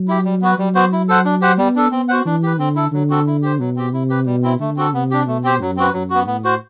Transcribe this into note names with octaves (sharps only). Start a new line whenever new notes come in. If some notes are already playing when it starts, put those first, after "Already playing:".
Already playing: F#3
E4 G4
G3
B3 F#4 B4
F#3 G3
B3 F#4 C5
E4
A4 C5 F#5
D4
G4 C5 F#5
G3 B3
D4 A4
B3 C4
F#4 C5 F#5
E3 D4
G4 B4
D3 C4
E4 A4
D3 F#3
C4 F#4 A4
E4
G4 C5
B2 F#3
C4 G4
C3 E4
G4 B4
B2 G3
C4 E4
D3 A3
C4 F#4 A4
C3 B3
D4 G4
B2 A3
C4 G4 C5
F#2 F#3
C4 F#4 B4
F#2 F#3
B3 F#4
A2 B3
F#4 C5